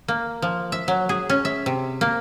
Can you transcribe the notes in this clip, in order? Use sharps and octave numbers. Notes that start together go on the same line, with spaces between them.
A#3
F3
E5
F#3
G#4
C#4
E5
C3
A#3